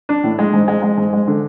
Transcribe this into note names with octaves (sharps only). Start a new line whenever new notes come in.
D4
A2
G#3
G#2
G#3
G#3
G#2
G#3
D3